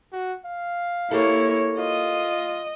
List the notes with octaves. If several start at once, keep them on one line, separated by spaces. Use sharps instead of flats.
F#4
F5
A#3 E4 G4 A4 C#5
F4 D#5